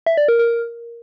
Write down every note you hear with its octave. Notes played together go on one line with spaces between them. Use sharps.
E5
D5
A#4
A#4